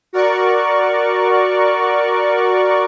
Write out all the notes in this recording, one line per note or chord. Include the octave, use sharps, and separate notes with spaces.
F#4 A#4 D5 C#6